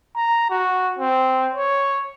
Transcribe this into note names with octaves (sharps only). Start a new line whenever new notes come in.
A#5
F#4
C4
C#5